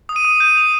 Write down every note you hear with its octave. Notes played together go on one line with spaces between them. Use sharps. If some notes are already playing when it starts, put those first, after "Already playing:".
D#6
D#7
D#6
G6 D#7
D#6